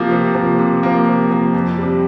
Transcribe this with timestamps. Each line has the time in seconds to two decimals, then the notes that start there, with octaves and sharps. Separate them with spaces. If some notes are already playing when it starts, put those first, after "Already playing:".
Already playing: C3 F3 A#3
0.11 C3
0.35 F3 A#3
0.59 C3
0.83 F3 A#3
1.06 C3
1.31 F3 A#3
1.54 F2
1.78 C3 G3